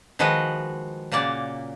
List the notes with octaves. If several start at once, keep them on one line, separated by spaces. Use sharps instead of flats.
D#3 F3 G#3 F#4 B4 D#5
A#2 C#3 A#3 D5 F#5